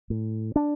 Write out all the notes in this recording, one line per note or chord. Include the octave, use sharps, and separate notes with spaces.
A2
D4